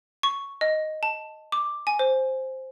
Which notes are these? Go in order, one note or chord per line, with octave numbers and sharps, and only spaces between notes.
C#6
D#5
A5
D6
G#5
C5